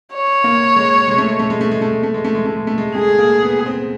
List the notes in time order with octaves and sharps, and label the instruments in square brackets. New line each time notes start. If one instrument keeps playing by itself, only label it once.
[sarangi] C#5
[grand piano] A#3
G#3
G#3
A3
G#3
A3
G#3
A3
G#3
A3
G#3
A3
G#3
A3
G#3
A3
G#3
A3
G#3
[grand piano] A3 [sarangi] G#4
[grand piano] A#3
B3
C4